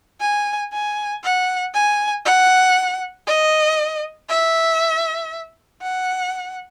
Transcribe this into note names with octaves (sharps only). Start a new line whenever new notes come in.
G#5
G#5
F#5
G#5
F#5
D#5
E5
F#5